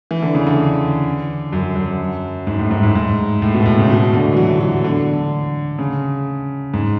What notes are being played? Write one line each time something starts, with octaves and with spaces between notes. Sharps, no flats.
E3
D3
C#3
D3
F#2
F#2
G#2
A2
G#2
G#2
G#2
A2
B2
A2
C#3
B2
D3
E3
F#3
F#3
D3
C#3
G#2